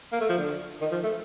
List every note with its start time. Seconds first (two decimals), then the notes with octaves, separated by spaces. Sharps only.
0.12 A#3
0.21 A3
0.29 F3
0.38 D3
0.81 D#3
0.92 F3
1.04 A3